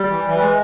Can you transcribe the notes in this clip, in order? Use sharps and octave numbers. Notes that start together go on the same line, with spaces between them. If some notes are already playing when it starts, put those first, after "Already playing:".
Already playing: G3
E3
E3
G3
G#3